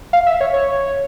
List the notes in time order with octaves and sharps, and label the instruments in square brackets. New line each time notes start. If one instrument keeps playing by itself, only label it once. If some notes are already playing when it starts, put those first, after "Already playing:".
[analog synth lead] F5
E5
C#5
C#5